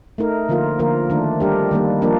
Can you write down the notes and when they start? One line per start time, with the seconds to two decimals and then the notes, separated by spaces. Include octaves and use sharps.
0.18 A3 D#4 A#4
0.49 D3 F3 A#3 F4 A#4
0.79 D3 F3 A#3 F4 A#4
1.10 D#3 A3 D4
1.40 G3 D4 G4 A#4
1.71 D#3 G3 A#3
2.02 F3 A#3 D4